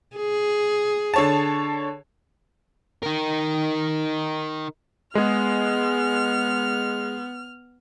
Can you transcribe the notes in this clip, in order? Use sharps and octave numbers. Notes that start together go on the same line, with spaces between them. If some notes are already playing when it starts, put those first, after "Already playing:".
G#4
D3 C#5 A5
D#4 A#4
G#3 B3 G#4 F6